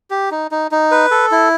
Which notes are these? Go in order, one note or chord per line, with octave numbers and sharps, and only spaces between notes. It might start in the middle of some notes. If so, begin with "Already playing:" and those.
G4
D#4
D#4
D#4
B4
A4
E4